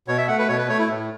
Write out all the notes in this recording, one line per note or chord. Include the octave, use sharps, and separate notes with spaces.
B2 C#5
E5
A3 F#5
B4
B2 C#5
B4
A3 C#5
E4
A2